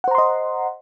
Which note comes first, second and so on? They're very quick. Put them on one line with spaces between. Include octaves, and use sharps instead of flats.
F#5 C5 A#5 C6 D#5